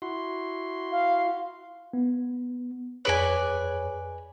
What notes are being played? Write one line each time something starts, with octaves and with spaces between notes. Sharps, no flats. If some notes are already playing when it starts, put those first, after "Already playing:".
E4 F#4 C6
F5
B3
F2 G#4 B4 C#5 D5 G#5